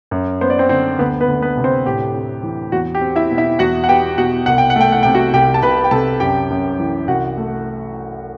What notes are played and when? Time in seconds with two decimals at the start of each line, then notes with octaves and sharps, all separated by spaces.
0.11 F#2
0.41 B3 C5
0.50 D5
0.59 C4 C5
0.69 D3 C4 C5
0.99 D2 B3 B4
1.20 B3 B4
1.28 D2
1.42 B3 B4
1.57 C3
1.64 C4 C5
1.85 A2 G4
2.14 C4
2.43 E3
2.72 E2 F#4
2.95 G4
3.01 C4
3.16 E4 E5
3.31 B2
3.38 E4 E5
3.59 E2 F#4 F#5
3.84 F#5
3.88 B3 G4 G5
4.18 B2 F#4 F#5
4.46 C2 F#5
4.58 G5
4.70 F#5
4.76 A3 G5
4.92 F#5
5.03 C3 G5
5.14 F#4 F#5
5.33 C2 G4 G5
5.54 A5
5.62 C2 B4 B5
5.84 G5
5.91 C3 A4 A5
6.20 F#2 G4 G5
6.50 F#2
6.79 E3
7.08 C2 F#4 F#5
7.37 A3